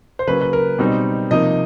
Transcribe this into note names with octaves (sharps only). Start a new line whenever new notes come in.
C5
C#3 F#3 A#3 C#4 B4
B4
A#4
B2 G3 C4 D#4
C3 F3 A#3 D#4 D#5